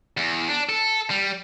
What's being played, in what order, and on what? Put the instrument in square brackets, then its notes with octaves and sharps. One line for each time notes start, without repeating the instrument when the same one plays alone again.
[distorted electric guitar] E2
D4
A4
G3